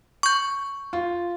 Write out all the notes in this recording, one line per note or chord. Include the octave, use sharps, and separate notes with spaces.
C#6 G6
F4